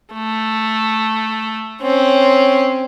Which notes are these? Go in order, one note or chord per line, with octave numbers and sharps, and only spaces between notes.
A3
C4 C#4